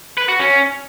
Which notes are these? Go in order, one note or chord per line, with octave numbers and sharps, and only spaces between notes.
B4
F#4
C#4